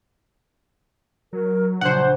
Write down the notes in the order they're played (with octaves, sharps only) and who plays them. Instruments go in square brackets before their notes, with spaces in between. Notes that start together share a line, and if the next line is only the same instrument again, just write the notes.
[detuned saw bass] F#3 [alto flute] A#4
[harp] A#1 C#3 [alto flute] D4 [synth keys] C5 F#5